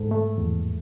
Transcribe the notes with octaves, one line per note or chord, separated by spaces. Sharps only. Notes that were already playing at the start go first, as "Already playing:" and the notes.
Already playing: G#2 A4
A3
E2